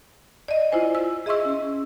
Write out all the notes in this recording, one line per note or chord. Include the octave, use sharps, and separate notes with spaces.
D5 D#5
E4 F4 C5 G#5
E6
G#4 D#5 E5 C6 C#6 E6
C#4